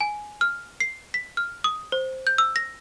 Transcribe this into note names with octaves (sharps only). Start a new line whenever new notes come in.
G#5
F6
C7
B6
F6
D#6
C5
G6
E6
A#6